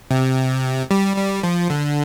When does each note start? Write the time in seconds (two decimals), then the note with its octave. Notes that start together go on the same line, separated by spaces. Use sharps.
0.11 C3
0.91 G3
1.16 G3
1.43 F3
1.70 D3